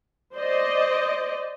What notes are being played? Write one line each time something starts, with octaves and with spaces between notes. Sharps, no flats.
C5 D5 D#5